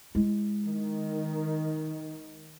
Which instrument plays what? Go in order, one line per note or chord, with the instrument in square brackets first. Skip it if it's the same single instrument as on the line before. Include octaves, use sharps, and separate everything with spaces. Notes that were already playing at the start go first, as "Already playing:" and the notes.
[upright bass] G#3 E4
[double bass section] D#3